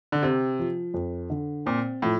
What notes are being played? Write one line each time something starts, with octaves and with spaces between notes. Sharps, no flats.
D3
C3 C4
F3
F2
D3
A#2 C4
A2 F3